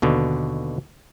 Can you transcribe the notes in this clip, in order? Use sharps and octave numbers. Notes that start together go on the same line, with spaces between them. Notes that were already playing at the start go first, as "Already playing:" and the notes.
D#2 B2 D3